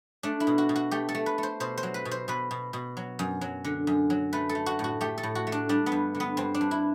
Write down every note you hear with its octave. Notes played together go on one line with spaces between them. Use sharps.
A3 D4
E4
B2
F#4
B2
F#4
A3 G4
A4
A3
B4
A3
C5
B2 C5
C5
F#3
B4
B2
C5
B2 B4
B2
B2
F#3
F#2
F#3
D3
F#2
F#3
A3 B4
A4
A3
F#4
A2
F#4
A3 G4
A4
A2
F#4
A3
D4
G3 D4
B3
G2
D3
B3
G2 C4
D4
G2
E4